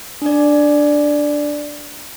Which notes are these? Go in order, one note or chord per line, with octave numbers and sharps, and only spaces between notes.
D4 D5